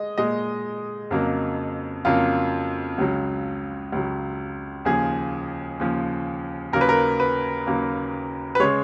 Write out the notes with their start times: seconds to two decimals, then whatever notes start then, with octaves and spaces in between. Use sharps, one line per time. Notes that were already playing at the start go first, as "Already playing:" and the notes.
Already playing: G#3 D#5
0.18 A#2 G#3 D#5
1.11 F2 C#3 F#3 A#3
2.05 F2 C#3 F#3 A#3 F4
2.98 C#2 C#3 F#3
3.92 C#2 C#3 F#3
4.85 D#2 C#3 F3 G#4
5.80 D#2 C#3 F3
6.73 D#2 C#3 F#3 A#3 A#4
6.81 B4
6.89 A#4
7.20 B4
7.67 D#2 C#3 F#3 A#3
8.55 B4
8.60 C#3 G#3 C#5